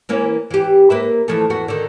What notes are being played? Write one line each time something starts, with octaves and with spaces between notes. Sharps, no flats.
E3 A#3 C#4
E3 G4
A#3 B4 E5
E3 F3 A3
E2 B3 F#4
D3 D#3